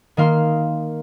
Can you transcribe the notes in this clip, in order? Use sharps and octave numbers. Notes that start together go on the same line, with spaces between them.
D#3 A#3 F5 C6